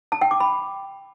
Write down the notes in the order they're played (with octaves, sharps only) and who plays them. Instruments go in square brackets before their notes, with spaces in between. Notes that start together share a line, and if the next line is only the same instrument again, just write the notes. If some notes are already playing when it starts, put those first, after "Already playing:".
[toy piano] A5
G5
D6
B5